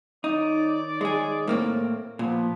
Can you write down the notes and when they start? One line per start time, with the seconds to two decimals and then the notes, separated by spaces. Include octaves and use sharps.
0.24 D#3 D#4 C#5 D5
1.01 G#3 G#4
1.47 A2 A#3 C4
2.19 A#2 F3 B3